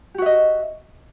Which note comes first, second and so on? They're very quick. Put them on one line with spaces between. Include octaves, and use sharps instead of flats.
G4 F#4 E5 D#5